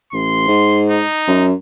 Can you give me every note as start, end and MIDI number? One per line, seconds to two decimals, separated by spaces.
0.13 0.44 33
0.13 0.83 84
0.48 1.02 44
0.90 1.46 63
1.27 1.53 42